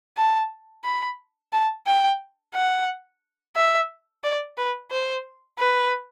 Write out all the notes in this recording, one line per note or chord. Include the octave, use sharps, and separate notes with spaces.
A5
B5
A5
G5
F#5
E5
D5
B4
C5
B4